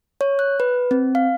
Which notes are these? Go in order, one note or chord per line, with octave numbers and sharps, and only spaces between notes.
C#5
F#6
B4
C4
F5